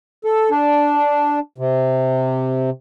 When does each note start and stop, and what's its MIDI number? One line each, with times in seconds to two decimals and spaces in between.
0.24 0.50 69
0.50 1.39 62
1.58 2.70 48